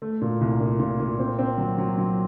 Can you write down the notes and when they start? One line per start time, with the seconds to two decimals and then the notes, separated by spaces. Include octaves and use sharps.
0.02 A3
0.21 A#2
0.41 C2
0.60 A#2
0.80 A#2
1.00 A#2
1.19 C4
1.39 C4
1.58 F#3
1.78 F#3
1.98 F#3